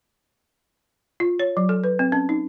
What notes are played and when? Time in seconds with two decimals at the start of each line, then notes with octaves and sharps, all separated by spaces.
1.20 F4
1.40 C#5
1.57 F#3
1.69 A4
1.84 B4
1.99 C4
2.12 C#4
2.29 D#4